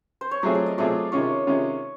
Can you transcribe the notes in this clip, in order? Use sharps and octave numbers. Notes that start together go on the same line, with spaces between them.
C5
C#5
F#3 A3 C4 F4 G#4 D5
D5
D#5
F#3 A3 C4 F4 G#4 D5
C3 D#3 G#3 C#4 F4 C#5
C3 D#3 G#3 C#4 F4